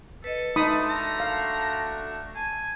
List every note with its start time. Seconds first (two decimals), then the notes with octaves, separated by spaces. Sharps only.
0.24 A4 B4 D#5
0.56 A3 D4 D#4 F#4 A5 B5 C6 D#6
0.89 A#5
1.20 F5
2.35 G#5 A5